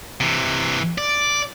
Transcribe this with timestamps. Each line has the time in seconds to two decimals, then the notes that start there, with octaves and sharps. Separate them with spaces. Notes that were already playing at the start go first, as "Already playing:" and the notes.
0.20 C3 E3
0.98 D5